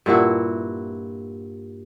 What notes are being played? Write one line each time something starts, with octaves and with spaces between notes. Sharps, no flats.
G2 A#2 E4 F#4